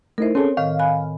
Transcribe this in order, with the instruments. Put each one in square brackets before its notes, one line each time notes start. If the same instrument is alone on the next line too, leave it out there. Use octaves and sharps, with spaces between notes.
[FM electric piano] A3 D#4 E4 [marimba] A#4 C5
[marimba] C4 C#5 [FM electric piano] C#4 G#4 A4
[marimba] A2 D#3 [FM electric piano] F5
[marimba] G#5 B5 F#6